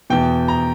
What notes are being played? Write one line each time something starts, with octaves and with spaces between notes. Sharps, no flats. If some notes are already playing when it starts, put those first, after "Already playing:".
E2 B2 G5
A#5